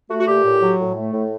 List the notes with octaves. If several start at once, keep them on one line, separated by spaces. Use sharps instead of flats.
A3 F#4
F#4
A#2 G4
A2
F#3
A2
A3
A2